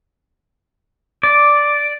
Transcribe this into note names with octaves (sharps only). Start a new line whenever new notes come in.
D5